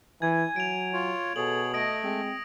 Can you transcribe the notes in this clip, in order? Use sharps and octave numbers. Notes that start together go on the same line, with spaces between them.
E3 G#5 G#6
F#3 D7 F7
F4 C#5
B2 G#4 A4 C#5 F#7
A3 D#5 D#6 A#6 D7
G#3 C4